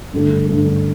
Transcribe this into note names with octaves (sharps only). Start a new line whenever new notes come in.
G2 D3 A3
G2 D3 A3